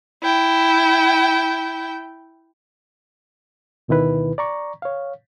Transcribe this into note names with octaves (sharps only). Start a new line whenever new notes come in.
E4 G5
D2 B2 D#3 E4 B4
D5 A#5 C#6
C#5 F5